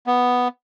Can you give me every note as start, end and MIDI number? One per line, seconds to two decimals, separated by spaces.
0.07 0.48 59